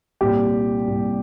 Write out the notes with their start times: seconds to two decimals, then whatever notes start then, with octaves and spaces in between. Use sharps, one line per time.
0.21 C2 A#2 G4
0.87 C2 A#2